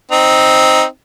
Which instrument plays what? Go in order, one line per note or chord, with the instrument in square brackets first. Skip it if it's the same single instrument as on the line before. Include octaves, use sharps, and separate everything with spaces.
[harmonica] C4 D#4